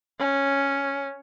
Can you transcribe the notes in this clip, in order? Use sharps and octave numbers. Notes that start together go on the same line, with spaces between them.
C#4